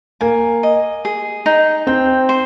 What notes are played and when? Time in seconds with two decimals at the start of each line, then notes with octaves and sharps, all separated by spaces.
0.21 A#3 G#5
0.63 D#5
1.05 G#4
1.46 D#4
1.87 C4 G5
2.29 C5